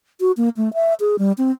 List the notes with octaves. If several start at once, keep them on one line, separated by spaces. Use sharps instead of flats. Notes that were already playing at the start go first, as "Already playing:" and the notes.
F#4
A#3
A3
E5
G#4
G3
C4